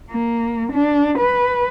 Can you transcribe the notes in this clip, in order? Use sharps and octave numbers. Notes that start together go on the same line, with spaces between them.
A#3
D4
B4